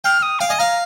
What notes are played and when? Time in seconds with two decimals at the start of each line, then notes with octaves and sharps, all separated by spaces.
0.04 G5 F6
0.23 D#6
0.39 F5 G5
0.49 D#5 G#5
0.59 F5 A#5